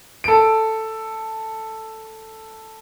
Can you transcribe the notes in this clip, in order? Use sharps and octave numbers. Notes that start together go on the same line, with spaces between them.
A4 D7